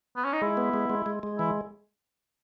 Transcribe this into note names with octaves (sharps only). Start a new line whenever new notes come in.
B3
C#4
D#4
G#3 E4
B3
G#3
G#3
G#3
G#3
E3 E4